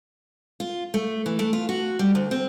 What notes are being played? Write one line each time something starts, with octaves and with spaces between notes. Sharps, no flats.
F4
A3
E3
A3
F4
F#4
G3
D2
C4